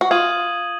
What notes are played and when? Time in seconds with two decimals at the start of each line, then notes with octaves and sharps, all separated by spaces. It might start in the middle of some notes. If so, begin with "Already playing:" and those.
0.01 F#4
0.11 F4 D#6 G#6 D#7 F#7